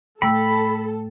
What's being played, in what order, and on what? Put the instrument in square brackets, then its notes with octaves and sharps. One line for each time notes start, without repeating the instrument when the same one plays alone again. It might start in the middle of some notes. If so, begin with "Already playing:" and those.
[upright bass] A2 [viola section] A4 [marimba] G5 E6 [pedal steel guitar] B5